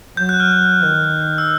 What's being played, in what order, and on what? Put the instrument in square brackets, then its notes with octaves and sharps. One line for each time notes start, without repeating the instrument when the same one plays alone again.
[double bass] F#3 [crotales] G6
[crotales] F#6
F6
F#6
[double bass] D#3
[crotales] E6